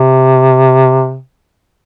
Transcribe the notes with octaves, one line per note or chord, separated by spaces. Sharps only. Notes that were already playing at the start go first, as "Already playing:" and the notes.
Already playing: C3